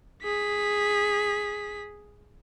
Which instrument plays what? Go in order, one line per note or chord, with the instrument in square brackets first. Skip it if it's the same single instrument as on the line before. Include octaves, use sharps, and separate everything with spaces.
[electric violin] G#4 B6